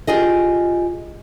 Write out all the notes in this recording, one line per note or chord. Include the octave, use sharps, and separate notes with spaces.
F4 G4 G#4 D#5